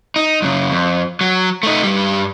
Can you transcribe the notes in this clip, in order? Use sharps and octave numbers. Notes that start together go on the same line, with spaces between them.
D#4
F#2 C#3
F2
F#3
A3 D#4
G2 G3